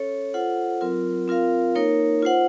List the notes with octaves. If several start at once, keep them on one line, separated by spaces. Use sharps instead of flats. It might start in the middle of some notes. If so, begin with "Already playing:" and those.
Already playing: C#4 A4 C#5
F4 A4 C5 F#5
F#3 C4 F4 A#4
C4 F4 A#4 F5
A#3 D#4 A#4 C#5
F4 C5 F#5